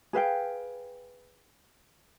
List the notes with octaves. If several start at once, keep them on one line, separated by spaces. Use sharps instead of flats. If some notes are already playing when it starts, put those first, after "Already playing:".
G#4 B4 F5 G5